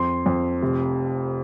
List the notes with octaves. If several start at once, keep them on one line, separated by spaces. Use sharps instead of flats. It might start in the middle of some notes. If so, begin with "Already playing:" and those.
Already playing: F2 C6
F2
F1